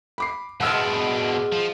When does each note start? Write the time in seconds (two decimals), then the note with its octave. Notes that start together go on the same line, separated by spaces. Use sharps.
0.18 B5 D6 C7
0.60 B2 G#3 B3 D4 F#5 E6 F6
1.52 F3